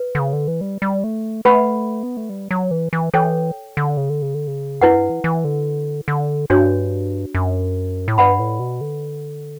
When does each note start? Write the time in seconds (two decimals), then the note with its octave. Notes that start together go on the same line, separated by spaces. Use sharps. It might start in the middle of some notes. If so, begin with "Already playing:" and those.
Already playing: B4
0.15 D3
0.19 C#3
0.33 D3
0.48 E3
0.61 G3
0.82 G3
1.04 A3
1.45 A3 B4 F#5 B5
2.03 B3
2.17 A3
2.30 G3
2.51 F#3
2.71 E3
2.93 E3
3.14 E3 A4 C#5 G5
3.77 D3
3.97 C#3
4.10 D3
4.22 C#3
4.34 D3
4.47 C#3
4.81 F#2 E4 B4 F#5
4.96 G2
5.10 E3
5.24 E3
5.44 D3
6.08 D3
6.50 G2 D4 F#4 C#5
7.35 F#2
8.08 A2
8.18 G2 B4 D5 F#5 B5
8.39 A2
8.60 B2
8.81 D3